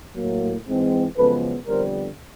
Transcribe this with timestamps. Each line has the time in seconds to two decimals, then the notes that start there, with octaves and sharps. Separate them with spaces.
0.14 A2 F#3 A#3
0.66 G#2 E3 G#3 C4
1.16 F#2 C#3 F3 G#3 B3 A4 B4
1.67 F2 D3 G3 B3 A#4 C5